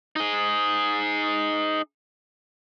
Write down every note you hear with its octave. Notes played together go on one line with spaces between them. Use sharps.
D#4 G#4